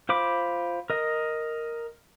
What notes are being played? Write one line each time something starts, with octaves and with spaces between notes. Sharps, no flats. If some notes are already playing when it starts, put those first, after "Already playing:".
F4 C5 B5 D6
A#4 D#5